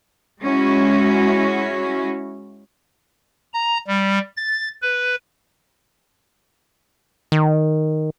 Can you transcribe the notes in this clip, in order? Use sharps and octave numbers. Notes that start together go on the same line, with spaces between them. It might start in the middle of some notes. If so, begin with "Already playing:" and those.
G#3 C#4 E4 F#4
A#5
G3
A6
B4
D#3